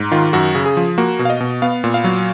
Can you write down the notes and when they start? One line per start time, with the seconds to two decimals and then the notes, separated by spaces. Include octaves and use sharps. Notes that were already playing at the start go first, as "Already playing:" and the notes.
Already playing: G#2
0.11 D#3 F4
0.33 F#2 F#4
0.55 C#3
0.65 G#4
0.77 F3
0.98 A#3 F#4
1.19 B2
1.25 F5
1.30 D#5
1.40 B2
1.62 B3 F5
1.84 A#2
1.94 F5
2.04 F#3